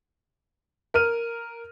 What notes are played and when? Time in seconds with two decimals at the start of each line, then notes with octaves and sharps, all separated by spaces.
0.94 A#4 F6 D#7